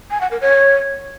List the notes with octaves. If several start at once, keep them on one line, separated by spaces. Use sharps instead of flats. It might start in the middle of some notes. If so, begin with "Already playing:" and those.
G#5
F#5
A#4
C#5